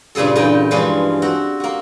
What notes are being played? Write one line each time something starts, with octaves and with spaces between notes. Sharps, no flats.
G2 A#2 C#3 G#4 A4
E2 A#2 C#3 D#4 G5
G2 E3 F3 G#3 C#4 D4
C4 F#4
A#3 F#4